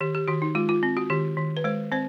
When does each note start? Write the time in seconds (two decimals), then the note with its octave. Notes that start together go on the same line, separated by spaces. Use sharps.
0.01 D#3 G4
0.15 G4
0.28 D#3 F#4
0.42 D#4
0.55 G#3 F4
0.69 F4
0.83 C4
0.97 F#4
1.10 D#3 G4
1.37 D#3
1.57 B4
1.64 G#3 C5
1.92 C4 C5